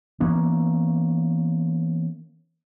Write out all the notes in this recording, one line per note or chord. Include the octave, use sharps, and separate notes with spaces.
E3 A#3 B3 C#4